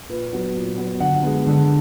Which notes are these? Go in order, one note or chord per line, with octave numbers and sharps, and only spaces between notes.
A#2 B4
F#3 B3
A#2
F#3 B3
D3 F#5
G#3 B3
D3